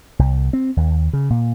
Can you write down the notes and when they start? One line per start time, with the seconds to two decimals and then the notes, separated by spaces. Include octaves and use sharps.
0.19 C2
0.53 C4
0.77 D#2
1.13 C#3
1.30 A#2